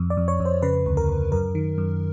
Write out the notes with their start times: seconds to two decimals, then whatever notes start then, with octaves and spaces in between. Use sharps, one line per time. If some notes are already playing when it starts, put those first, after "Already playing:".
Already playing: F2
0.10 D5
0.17 F2
0.28 C#5
0.40 F2
0.45 C5
0.62 C#3 B4
0.86 D2
0.97 A#4
1.09 D2
1.32 F#2 A#4
1.55 D#3
1.78 F#2